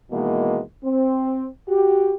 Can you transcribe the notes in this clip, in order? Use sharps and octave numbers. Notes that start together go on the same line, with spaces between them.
B2 D#3 E3 G#3 A#3
C4
F#4 G4